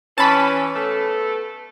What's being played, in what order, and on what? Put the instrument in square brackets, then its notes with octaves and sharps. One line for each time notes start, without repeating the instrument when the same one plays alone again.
[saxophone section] E3 C#4 [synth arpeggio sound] A5 B5
[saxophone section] A3 B3 A4